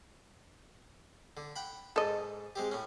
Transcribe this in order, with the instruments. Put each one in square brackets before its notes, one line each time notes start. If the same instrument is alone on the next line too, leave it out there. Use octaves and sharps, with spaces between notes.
[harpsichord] D3
F#5 G5 B5
[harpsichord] G#2 [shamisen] A4 D#5
[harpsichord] G#3 C4 G4
A2 C#4